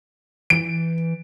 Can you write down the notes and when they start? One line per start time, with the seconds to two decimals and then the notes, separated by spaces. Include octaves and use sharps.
0.50 E3 D7